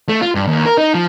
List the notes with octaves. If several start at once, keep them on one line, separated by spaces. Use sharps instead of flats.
A3
F4
G2
D#2
A#4
D#4
F3